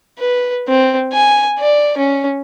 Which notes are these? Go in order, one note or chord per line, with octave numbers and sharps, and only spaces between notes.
B4
C4
G#5
D5
C#4